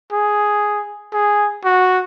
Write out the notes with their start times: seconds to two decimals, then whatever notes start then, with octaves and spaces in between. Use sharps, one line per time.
0.12 G#4
1.13 G#4
1.65 F#4